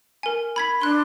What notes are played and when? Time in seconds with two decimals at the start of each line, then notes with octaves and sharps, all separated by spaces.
0.23 A#4 G#5
0.56 B5 G#6 B6
0.82 D4 C6 F#6